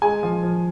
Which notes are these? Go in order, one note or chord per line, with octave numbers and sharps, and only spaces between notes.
G#3 G#5
F3
F3